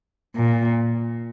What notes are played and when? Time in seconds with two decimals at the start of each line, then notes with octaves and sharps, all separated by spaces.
0.36 A#2